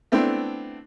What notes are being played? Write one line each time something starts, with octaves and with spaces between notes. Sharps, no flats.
A3 B3 C4 D4 E4